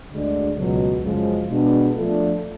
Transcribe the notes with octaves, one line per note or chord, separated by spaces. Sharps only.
D2 D3 G#3 D4
C#2 B2 F#3
F#2 C#3 F3 G#3
B2 G#3 B3 D4
F3 A3 D4 F4 A4